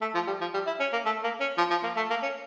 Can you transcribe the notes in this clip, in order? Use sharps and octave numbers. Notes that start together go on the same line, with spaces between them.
A3
F3
G3
F3
G3
E4
C#4
A#3
A3
A#3
C#4
F3
F3
A#3
A3
A#3
C#4